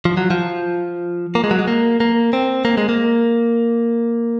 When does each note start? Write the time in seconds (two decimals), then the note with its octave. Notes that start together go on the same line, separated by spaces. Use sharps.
0.05 F3
0.17 F#3
0.30 F3
1.35 A#3
1.44 G#3
1.51 F#3
1.59 G#3
1.68 A#3
2.00 A#3
2.33 C4
2.65 A#3
2.77 G#3
2.89 A#3